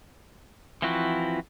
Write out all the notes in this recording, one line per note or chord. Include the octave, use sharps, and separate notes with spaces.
E3 F3 C4 E4 F#4